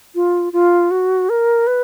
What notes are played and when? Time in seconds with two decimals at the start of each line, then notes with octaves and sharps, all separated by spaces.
0.15 F4
0.53 F4
0.91 F#4
1.30 A#4
1.67 B4